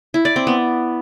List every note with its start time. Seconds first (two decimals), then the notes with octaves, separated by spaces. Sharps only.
0.14 E4
0.25 D5
0.36 C4
0.47 B3